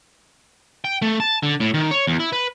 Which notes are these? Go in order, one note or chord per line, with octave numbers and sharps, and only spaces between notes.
G5
A3
A5
D3
A2
D#3
C#5
E2
E4
B4